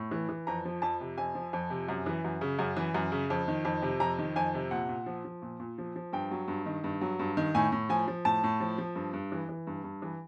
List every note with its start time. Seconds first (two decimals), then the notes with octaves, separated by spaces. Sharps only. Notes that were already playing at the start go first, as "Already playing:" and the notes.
Already playing: A2
0.11 E3
0.29 E3
0.47 F2 A#5
0.65 F3
0.82 F2 A5
1.01 C3
1.18 F2 G#5
1.35 F3
1.53 F2
1.70 C3
1.88 F#2
2.06 E3
2.24 F#2
2.41 C#3
2.59 F#2
2.77 E3
2.94 F#2
3.12 C#3
3.30 F2
3.48 D#3
3.65 F2
3.82 C3
4.00 F2 A#5
4.19 D#3
4.36 F2 G#5
4.54 C3
4.71 A#2 F#5
4.89 A#2
5.06 F3
5.25 F3
5.42 A#2
5.60 A#2
5.78 F3
5.96 F3
6.13 G2 G5
6.31 F#3
6.48 G2
6.66 D#3
6.84 G2
7.01 F#3
7.19 G2
7.37 D#3
7.55 A2 G#5
7.72 A2
7.89 F3 G#5
8.08 F3
8.25 A2 A5
8.43 A2
8.60 F3
8.78 F3
8.95 G2
9.13 G2
9.32 E3
9.49 E3
9.67 G2
9.84 G2
10.02 E3